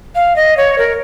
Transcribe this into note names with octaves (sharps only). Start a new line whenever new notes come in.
F5
D#5
C#5
A#4